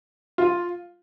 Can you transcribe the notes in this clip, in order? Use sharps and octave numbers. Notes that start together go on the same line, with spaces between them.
F4